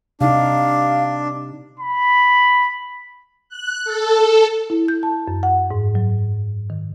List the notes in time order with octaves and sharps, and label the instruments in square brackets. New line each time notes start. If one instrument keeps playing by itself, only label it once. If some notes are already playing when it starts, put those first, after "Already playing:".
[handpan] C3 D#4 [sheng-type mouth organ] D4 [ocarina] F5
[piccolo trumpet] B5
[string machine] F#6
A4
[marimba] E4
G6
A5
F#2
F#5
G#2
F#3
D#3